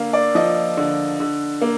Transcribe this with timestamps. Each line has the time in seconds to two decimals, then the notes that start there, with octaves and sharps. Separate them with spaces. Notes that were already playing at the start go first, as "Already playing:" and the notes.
Already playing: D3 A#3 F5
0.13 D5
0.35 F3 D#5
0.77 D3
1.20 D3
1.62 A#3